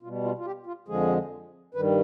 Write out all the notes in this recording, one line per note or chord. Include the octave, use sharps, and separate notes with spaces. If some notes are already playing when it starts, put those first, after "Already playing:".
B2 G3 F4
F4
F4
G4
F4
F2 D3 F3 G#3 G#4
G2 D#3 G3 B4